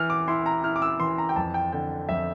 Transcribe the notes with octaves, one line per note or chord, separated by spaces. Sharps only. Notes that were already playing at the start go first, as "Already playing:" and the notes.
Already playing: E3 F6
D6
E4 C6
A#5
E4 F6
D6
E6
E3 C6
A#5
G5
F2 A5
G5
D3 G5
F2 E5